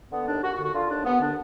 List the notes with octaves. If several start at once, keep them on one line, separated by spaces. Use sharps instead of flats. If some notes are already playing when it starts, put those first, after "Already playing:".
D3 B3
D#2 D4
D#2 F#4
F#4
D3
F#4
D3 F4
D#2 D4
D#2 B3
D3 D4